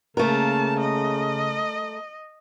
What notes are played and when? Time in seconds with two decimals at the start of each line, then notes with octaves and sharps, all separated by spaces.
0.17 C#3 A3 A#3 A#4 A5
0.80 D#5